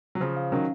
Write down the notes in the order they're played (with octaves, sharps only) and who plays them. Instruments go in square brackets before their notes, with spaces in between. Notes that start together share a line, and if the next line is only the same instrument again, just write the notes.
[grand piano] F#3
[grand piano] C#3 F3 [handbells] C5
[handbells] F5
[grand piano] D#3 F#3 [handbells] C#4